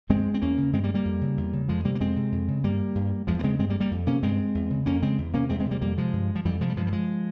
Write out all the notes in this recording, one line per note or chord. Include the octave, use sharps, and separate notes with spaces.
G2 G#3 C4
C4
E2 A#3 C#4
C#3
G2 G#3 C4
G3 A#3
G3 A#3
F2
C#3
E2
C#3
F2 F3 G#3
C3 G3 A#3
A#3
F2 G#3 C4
C3
F2
C#3
G2 G3 A#3
G2
E2 F3 G#3
A#3
C#3 G#3 C4
G2 G#3 C4
G3 A#3
G3 A#3
F2
C3 A#3 C#4
G2 G#3 C4
E2
C#3
F2 A#3 C#4
C#3 G#3 C4
E2
C3 A#3 C#4
E2 G#3 C4
G#3 C4
C3
G3 A#3
F2 G3 A#3
C3 F3 G#3
G2
F3
F2 E3 G3
C3 F3 G#3
G3
G2 F3 G#3
G3
F3 G#3